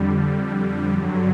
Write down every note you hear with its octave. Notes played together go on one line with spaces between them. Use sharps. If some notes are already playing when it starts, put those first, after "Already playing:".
Already playing: F2 D3 G3
G2 D3 F#3